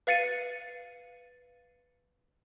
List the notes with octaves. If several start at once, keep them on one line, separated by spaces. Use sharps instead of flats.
B4 F5 A6 C#7 D#7